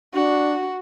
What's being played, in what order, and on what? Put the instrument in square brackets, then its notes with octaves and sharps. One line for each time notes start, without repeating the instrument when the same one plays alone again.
[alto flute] D4 [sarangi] F#4